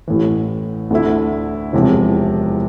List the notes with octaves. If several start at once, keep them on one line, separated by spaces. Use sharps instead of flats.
A1 A2 E3
D2 D3 A3 E4
E1 E2 C3 F3